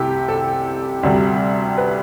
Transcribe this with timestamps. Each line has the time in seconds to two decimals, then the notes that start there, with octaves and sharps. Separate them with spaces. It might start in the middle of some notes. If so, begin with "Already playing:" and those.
Already playing: C2 C3 E3 A3 G4
0.28 A4
1.03 D2 C3 G3
1.78 B4